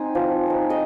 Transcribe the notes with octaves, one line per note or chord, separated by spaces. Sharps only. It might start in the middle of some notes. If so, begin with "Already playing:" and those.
Already playing: C4 D#4 G#5
F3
C4 D#4
D#5